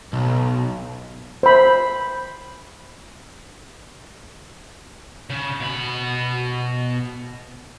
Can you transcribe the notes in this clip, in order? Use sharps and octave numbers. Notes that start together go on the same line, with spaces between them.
B1
C5 B5
C#3
B2 B5